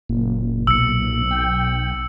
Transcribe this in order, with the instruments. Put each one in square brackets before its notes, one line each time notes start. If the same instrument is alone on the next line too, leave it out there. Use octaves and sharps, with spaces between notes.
[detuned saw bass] F#1 [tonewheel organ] A#2
[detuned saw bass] B1 [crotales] E6 C#7
[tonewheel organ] G5